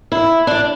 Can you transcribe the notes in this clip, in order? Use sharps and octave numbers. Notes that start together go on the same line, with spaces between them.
E4
D4